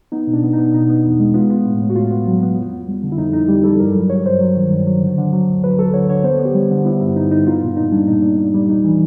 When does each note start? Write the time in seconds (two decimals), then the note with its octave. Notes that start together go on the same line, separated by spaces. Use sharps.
0.12 B3 D#4
0.27 B2
0.33 D4
0.43 B3
0.53 D#4
0.58 B3
0.73 B2 D#4
0.89 B3
1.05 E2
1.20 G#3
1.34 B3 F4
1.50 B3
1.66 A2
1.81 A2
1.90 F#4
1.96 A2 F4
2.11 B3
2.27 F#3
2.42 B3
2.58 F2
2.73 B3
2.88 G3
3.03 D3
3.12 E4
3.18 F2 D#4
3.33 F2 D#4
3.49 G3 G4
3.64 G3 A4
3.80 G2 A#4
3.95 F#3
4.10 F#3 C#5
4.26 G2 C5
4.41 F#3
4.57 D#3
4.71 G2
4.86 F#3
5.01 D3
5.18 D3
5.32 F#3
5.48 D2
5.63 F#3 B4
5.78 F#3 A4
5.94 D3 C#5
6.09 D3 C#5
6.24 B3 C5
6.39 B3
6.45 G4
6.54 G3
6.71 D3
6.85 B3 E4
7.00 G2 E4
7.16 G2 D#4
7.31 G2 D#4
7.47 B3 F4
7.61 A#2
7.77 A#2 D#4
7.92 G3 D4
8.07 A#2 D#4
8.23 A#2
8.38 A#2
8.54 G3
8.69 E2 D#4
8.84 E3